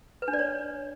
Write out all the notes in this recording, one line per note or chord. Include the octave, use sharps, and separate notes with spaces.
B4
D4
D5
C#5